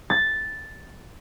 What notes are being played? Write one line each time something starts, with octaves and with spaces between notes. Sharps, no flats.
A6